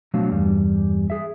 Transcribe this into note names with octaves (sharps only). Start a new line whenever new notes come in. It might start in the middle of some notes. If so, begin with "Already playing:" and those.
B2 F3 F#3 A3 D4 F5
E2 G2 G3
G#4 E5